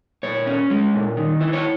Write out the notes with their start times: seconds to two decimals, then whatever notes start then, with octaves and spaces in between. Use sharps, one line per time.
0.23 A#2 C#5
0.47 C#4
0.70 G#3
0.94 A#2
1.17 D#3
1.41 E4
1.53 C#5